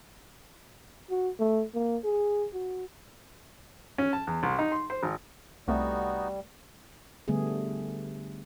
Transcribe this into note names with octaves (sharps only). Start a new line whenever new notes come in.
F#4
A3
A#3
G#4
F#4
C#4
A5
E2
C2
D#4
C6
C5
G#1
C2 G3 A3 B3 D#4 F#4
D3 G3 A3 B3 G#4